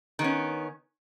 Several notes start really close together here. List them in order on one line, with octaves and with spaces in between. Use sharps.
D#3 B3 C#4